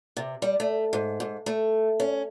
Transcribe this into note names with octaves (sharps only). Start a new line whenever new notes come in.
C3
G3
A3
G#2
G#2
A3
C#4